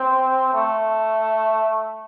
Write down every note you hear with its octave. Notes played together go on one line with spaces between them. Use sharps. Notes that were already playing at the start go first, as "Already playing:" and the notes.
Already playing: C4
A3